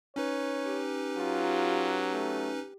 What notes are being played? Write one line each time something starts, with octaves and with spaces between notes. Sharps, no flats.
C#4 D#4 B4 C#5
G4
F#3 F4
A3